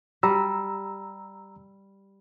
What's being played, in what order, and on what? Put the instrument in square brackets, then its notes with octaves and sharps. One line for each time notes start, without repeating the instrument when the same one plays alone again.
[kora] G3 [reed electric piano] A#5 E6